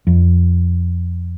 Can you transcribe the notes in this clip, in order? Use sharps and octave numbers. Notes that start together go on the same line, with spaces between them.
F2